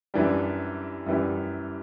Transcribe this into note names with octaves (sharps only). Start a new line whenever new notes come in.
F#2 E3 G3 D4
F#2 E3 G3